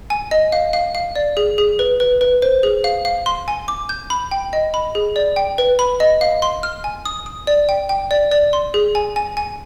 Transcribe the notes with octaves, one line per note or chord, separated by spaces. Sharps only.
G#5
D#5
F5
F5
F5
D5
G#4
G#4
B4
B4
B4
C5
G#4
F5
F5
C6
G#5
D6
G6
B5
G5
D#5
B5
G#4
D5
G5
B4
B5
D#5
F5
C6
F6
G#5
D#6
D#6
D5
G5
G5
D5
D5
C6
G#4
G#5
G#5
G#5